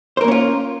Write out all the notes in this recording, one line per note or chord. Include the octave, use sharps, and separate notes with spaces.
A#3 C#4 F4 A#4 C5